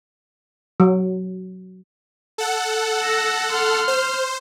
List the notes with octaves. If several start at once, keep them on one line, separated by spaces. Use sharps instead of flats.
F#3
A4 F#5
E6 A#6
C6 F6
C5